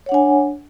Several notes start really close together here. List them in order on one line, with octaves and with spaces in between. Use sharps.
C#5 F#5 D4 G#5